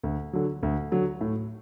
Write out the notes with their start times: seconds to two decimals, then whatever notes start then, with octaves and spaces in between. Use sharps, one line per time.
0.03 D2
0.33 D3 F#3
0.63 D2
0.92 D3 F#3
1.21 A2